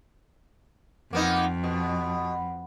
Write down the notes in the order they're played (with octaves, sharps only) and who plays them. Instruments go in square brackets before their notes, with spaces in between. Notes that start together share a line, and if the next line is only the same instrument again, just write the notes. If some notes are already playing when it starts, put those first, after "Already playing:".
[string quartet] F2 [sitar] A#3 B3 D#4
[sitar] B2